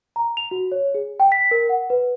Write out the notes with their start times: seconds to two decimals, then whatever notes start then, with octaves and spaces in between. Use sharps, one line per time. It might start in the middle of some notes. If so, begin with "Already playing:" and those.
0.16 A#5
0.37 F7
0.51 F#4
0.72 C#5
0.95 G#4
1.20 G5
1.32 B6
1.51 A#4
1.69 F#5
1.90 B4